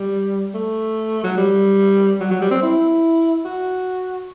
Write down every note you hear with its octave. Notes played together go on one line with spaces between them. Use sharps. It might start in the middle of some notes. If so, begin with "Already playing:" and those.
Already playing: G3
A3
F#3
G3
F#3
F#3
G3
C4
E4
F#4